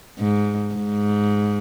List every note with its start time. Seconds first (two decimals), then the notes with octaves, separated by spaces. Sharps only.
0.19 G#2
0.75 G#2